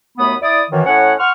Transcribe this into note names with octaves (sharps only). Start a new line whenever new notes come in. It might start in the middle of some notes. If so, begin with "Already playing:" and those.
D#2 F#3 A3 B3 B5 D#6
E4 D5 D#6
F#2 D#3 E3
A2 C#4 C#5 F#5
F#5 C6 C#6 F6